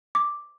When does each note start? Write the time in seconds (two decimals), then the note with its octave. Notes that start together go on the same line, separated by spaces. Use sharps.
0.15 D6